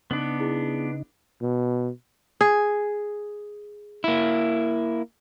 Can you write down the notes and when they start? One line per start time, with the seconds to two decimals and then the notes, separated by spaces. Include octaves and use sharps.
0.11 C#3 B3 D4 D#4
0.39 E4 G#4
1.41 B2
2.41 G#4
4.04 A#3 E4